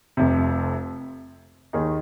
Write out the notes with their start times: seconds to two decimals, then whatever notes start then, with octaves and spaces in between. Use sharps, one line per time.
0.17 F1 F2 C3
1.73 D#2 D#3 A#3 D#4 G#4